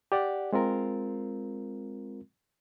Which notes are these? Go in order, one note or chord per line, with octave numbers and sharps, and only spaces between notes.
G4 D5 F#5
G#3 C4 F4 A#4